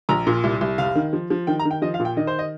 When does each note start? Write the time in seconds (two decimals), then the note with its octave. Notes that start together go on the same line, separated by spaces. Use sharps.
0.09 A#1 A#5
0.27 A#2
0.44 C2
0.61 C2
0.78 F1 F5
0.95 D#3
1.13 F3
1.30 F3
1.47 D#3 G5
1.59 A#5
1.65 D#3
1.71 G5
1.82 F3 D#5
1.94 F5
2.00 A#2
2.05 G5
2.17 D#3 D#5
2.27 C5
2.39 D#5